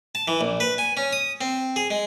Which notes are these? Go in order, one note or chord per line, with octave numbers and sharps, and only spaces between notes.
A5
E3
A#1
B4
G#5
C#4
D#6
C4
G#4
G#3